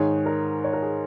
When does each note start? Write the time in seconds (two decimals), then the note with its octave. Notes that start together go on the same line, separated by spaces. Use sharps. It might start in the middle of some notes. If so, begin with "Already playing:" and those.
Already playing: G#2 D#3 G#4 C#5
0.26 A#4
0.64 C#5
0.73 A#4
0.82 G#4